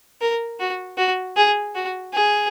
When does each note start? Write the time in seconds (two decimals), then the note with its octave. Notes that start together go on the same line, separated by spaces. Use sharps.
0.21 A#4
0.60 F#4
0.98 F#4
1.37 G#4
1.75 F#4
2.14 G#4